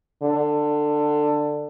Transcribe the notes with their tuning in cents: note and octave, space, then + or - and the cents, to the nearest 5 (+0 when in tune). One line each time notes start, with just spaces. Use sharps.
D3 +15